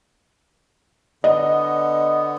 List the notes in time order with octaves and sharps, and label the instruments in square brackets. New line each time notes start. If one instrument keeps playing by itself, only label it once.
[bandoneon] D3 B3 [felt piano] D#5